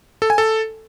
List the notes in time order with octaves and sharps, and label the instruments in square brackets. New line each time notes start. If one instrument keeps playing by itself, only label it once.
[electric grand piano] A4
G#5
A4